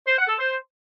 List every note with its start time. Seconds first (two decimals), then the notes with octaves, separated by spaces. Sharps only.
0.07 C5
0.18 F#5
0.28 A4
0.38 C5